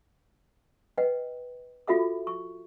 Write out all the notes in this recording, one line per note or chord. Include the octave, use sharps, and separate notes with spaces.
B4 D#5 F#5 G5
F4 F#4 A4 E5 F#5 D6
C#6